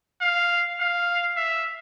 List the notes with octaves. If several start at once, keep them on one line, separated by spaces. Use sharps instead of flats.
F5
F5
E5